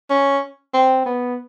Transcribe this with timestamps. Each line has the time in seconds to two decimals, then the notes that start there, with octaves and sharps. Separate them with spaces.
0.10 C#4
0.74 C4
1.06 B3